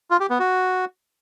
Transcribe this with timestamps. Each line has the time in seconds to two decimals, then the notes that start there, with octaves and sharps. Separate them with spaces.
0.11 F4
0.20 G4
0.30 B3
0.40 F#4